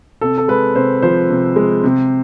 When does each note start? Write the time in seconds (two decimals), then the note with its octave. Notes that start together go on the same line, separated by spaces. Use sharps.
0.21 C3 A4
0.38 A4
0.48 G#3 B4
0.75 C3 C5
1.02 F3 C5
1.30 C3
1.56 G#3
1.84 C3